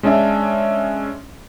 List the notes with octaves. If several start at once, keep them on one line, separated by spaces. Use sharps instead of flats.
G#3 C#4 D4 D#5 E5